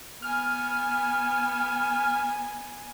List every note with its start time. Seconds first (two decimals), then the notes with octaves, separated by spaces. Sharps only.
0.22 B3 G#5 F6